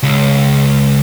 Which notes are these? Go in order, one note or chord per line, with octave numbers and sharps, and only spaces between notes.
C#2